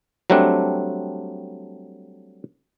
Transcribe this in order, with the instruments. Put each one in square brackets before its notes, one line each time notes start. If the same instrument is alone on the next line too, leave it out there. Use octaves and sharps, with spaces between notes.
[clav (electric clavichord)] F#3 G3 A3 C4 D4